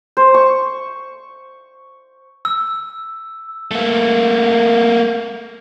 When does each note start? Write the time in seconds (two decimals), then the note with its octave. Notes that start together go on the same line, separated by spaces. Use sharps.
0.17 C5
0.34 C#6
2.45 E6
3.71 A3 A#3